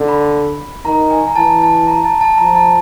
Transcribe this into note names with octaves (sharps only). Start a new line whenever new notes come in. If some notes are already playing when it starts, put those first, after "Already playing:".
Already playing: D3
B5
D#3 A#5
G#5
A#5
E3 A5
A5
A#5
A5
A5
F3 A#5
A5